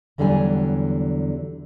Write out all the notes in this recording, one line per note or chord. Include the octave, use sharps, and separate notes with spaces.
E2 D3 F#3 G3 F5 G#5